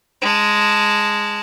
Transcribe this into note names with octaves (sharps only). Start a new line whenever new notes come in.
G#3 A5